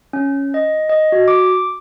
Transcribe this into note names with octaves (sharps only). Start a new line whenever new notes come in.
C#4
D#5
D#5
F#4
D6